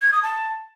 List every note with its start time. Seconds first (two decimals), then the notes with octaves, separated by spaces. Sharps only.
0.02 G#6
0.12 D#6
0.23 A5